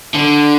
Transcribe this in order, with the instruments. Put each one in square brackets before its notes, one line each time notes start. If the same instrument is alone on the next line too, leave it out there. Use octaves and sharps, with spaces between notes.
[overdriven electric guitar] D3